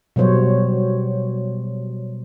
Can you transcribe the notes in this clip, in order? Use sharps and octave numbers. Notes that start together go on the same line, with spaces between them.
B2 F#3 G3 C5 C#5